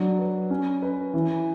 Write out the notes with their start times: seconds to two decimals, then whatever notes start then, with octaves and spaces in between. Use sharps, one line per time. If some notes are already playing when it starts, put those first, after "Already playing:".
Already playing: F#3 D4
0.19 B4
0.50 C#4
0.82 B4
1.14 E3